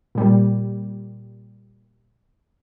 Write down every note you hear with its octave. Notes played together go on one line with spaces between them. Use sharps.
A#2 G3